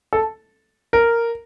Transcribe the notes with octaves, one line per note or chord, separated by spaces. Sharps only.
A4
A#4